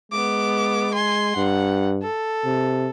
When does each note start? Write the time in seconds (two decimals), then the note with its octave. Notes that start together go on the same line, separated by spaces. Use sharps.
0.12 G#3 B3 D6
0.93 G#5 C6
1.37 G2 F#5
2.03 A4
2.46 C3